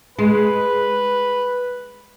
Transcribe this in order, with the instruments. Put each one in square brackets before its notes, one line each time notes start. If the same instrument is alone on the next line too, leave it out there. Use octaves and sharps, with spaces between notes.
[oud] G#3 [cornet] B4